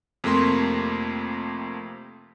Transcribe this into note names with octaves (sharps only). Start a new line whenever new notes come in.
F2 C3 A3 A#3 C6